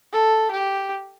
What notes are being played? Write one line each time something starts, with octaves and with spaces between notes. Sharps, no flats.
A4
G4